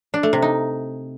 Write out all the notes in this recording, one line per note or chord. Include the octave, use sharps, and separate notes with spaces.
D4
A3
C3
D#4